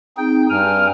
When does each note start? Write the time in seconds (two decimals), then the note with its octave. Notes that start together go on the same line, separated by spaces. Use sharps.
0.17 C4 D#4 G#4 G5
0.50 G2 G5 G#5 A#5 F6